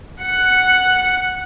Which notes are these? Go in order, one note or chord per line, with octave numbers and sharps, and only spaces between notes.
F#5 C#7